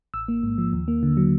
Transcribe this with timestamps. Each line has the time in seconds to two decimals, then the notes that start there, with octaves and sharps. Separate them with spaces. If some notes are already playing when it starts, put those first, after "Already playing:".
0.14 A1 E6
0.28 A#3
0.43 G#2
0.58 F3
0.73 D#2
0.88 A#3
1.03 D3
1.17 F#3